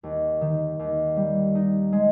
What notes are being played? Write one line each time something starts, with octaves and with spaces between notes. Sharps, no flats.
D#2
D#3
D#2
G3
D#4
G#3